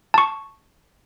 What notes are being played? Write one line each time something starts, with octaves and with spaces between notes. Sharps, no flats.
A5 C#6